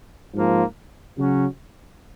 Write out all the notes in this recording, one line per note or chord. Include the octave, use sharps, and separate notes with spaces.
G#2 F3 A#3 F4
C#3 F#3 C#4 F#4